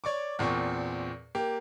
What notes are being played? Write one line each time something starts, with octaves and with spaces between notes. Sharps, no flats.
C#5 D5 C#6 D6
E2 A#2 C4 C#6
A#3 G4